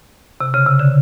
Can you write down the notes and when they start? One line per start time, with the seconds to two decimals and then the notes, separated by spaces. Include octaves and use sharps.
0.41 C3
0.54 C#3
0.67 C3
0.79 D3